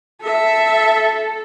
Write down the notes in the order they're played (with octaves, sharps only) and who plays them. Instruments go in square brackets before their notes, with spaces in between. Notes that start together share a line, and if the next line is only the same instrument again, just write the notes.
[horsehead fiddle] A4 [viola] E5